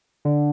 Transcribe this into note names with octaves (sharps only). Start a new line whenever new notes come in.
D3